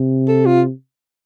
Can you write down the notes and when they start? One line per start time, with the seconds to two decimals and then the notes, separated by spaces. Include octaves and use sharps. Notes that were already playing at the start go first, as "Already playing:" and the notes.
Already playing: C3
0.28 A4
0.46 F4